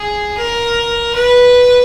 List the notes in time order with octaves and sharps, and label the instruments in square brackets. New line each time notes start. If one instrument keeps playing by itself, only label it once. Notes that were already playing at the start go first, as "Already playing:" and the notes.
Already playing: [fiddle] G#4
A#4
B4